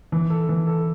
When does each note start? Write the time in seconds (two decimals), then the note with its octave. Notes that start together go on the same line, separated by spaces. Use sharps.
0.12 E3
0.30 A4
0.49 E3
0.67 A4